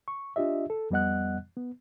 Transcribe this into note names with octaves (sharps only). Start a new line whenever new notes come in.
C#6
D4 F4 G4 D#5 E5
A4
F2 G3 B3 D#5 F#5 F#6
B3